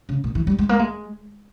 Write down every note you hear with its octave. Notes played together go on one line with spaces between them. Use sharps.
C#3
A#2
E3
G3
G#3
A#3
G#3